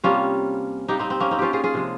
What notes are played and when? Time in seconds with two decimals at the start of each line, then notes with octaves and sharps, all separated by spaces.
0.04 C3 G3 A#3 C#4 F4
0.88 C3 G3 A#3 D#4 G4
0.99 C4 D#4
1.10 C4
1.20 A#3 C#4
1.31 C4 D#4
1.39 C#4 F4 G4
1.53 F4 G#4
1.64 F4 G#4
1.74 C3 F3 G#3